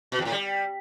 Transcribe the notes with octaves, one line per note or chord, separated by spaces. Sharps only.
B2
E2
A2
G3